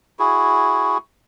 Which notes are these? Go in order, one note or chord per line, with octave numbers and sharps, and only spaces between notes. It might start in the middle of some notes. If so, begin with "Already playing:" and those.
E4 F#4 G#4